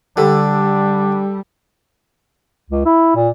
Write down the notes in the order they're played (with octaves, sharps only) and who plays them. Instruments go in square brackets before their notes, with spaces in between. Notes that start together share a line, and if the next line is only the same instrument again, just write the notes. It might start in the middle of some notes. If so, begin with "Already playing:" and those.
[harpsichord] D3 [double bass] G3 [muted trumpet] D4 [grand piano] G4 A4
[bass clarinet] C#2
E4
A#2